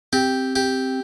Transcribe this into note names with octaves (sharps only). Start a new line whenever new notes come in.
C4 G4
G4